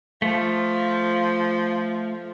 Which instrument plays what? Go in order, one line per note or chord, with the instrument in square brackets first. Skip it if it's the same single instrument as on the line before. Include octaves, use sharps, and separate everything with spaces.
[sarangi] F3 [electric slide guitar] A3